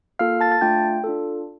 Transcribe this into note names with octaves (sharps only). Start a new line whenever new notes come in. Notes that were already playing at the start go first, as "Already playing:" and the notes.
A#3 F4 A4 F5 F6
A5 A6
A5 A6
A3 D4 F4 G5 G6
D4 F4 A4